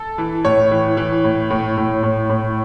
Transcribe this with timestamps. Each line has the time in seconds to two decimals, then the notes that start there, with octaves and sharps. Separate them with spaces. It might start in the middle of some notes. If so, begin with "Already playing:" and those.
Already playing: A4
0.18 E3
0.45 A2 C#5
0.71 E3
0.97 E3
1.24 A2
1.50 A2
1.77 A2
2.03 A2
2.30 A2